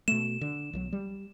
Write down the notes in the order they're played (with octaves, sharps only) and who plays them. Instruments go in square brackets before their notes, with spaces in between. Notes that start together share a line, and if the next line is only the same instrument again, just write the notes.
[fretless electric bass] B2 A3 [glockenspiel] E7
[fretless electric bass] D3
B1 D#3 F#3
G3